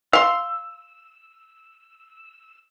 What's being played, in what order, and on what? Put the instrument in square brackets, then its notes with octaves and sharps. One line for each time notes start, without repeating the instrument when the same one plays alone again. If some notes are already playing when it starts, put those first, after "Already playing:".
[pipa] F5 C6 [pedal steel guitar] E6